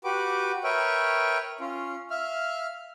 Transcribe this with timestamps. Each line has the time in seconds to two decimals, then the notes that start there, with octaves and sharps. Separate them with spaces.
0.04 F#4 G4 B4 D6
0.64 A#4 B4 C#5 E5 G5
1.60 C#4 F4
2.10 E5 F5 F6